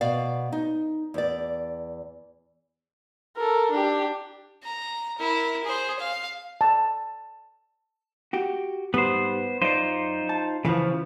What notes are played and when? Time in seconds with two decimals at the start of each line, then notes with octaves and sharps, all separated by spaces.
0.01 B2 D5 F5
0.52 D#4
1.14 E2 D5
3.36 A4 A#4
3.71 D4 G4
4.63 A#5
5.18 E4 A#4
5.65 G#4 C5
5.99 F5
6.61 A5
8.33 F#4 G4
8.94 G#2 G3 B3 C5
9.62 F#2 D#4 F4 C5 D5
10.29 A5
10.65 C#3 E3 F3 E4 B4